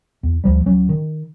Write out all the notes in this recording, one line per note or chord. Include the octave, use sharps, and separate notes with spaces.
E2
D2 F3 G3
D1 F#3 C#4
D#3